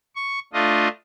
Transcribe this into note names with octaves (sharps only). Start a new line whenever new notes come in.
C#6
A3 D4 F4 D#5